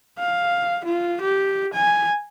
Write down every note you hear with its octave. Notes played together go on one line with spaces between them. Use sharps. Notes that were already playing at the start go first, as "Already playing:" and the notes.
F5
F4
G4
G#5